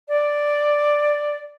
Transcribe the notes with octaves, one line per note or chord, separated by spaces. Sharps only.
D5